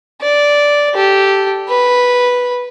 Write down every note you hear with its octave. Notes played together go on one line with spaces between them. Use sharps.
D5
G4 A4
B4